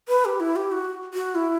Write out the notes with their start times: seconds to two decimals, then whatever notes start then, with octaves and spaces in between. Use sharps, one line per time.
0.08 B4
0.25 G4
0.40 E4
0.56 G4
0.72 F#4
1.14 F#4
1.35 E4